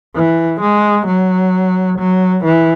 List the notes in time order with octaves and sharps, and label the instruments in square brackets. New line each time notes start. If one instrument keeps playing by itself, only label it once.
[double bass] E3
G#3
F#3
F#3
E3